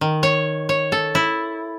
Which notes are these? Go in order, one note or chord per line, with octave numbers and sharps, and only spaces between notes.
D#3
C#5
C#5
A4
E4